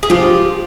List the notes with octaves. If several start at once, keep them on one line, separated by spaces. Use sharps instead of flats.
G#4
F3 F4 G4